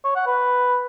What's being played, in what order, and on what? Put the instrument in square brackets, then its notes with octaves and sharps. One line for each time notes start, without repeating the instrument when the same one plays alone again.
[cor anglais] C#5
F#5
B4